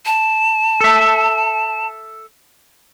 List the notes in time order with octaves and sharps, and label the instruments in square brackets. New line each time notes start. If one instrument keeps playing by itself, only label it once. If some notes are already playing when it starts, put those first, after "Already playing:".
[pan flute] A5
[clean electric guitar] A4 E5